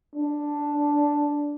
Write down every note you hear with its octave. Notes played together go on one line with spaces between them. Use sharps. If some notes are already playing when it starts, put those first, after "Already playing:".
D4